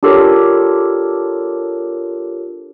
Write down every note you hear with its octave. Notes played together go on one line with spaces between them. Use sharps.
D4 F4 G4 A4 A#4 C#5